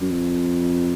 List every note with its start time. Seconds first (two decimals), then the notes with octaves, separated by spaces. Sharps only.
0.01 F#2
0.10 F2